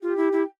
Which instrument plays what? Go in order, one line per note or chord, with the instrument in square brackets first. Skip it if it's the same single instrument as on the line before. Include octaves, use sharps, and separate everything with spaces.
[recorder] F4 [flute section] G4 G5
[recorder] E4
E4
[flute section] G5